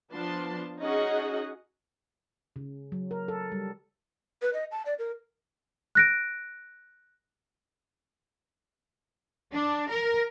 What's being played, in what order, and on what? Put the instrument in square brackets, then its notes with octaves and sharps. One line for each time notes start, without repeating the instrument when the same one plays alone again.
[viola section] F3 B3 D4 A5 C6
C#4 D#4 F#4 G#4 D#5 F#5
[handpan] C#3
F#3
A#4
A4
G3
[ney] B4
D#5
A5
D5
A#4
[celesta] F#6 A#6 D7
[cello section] D4
A#4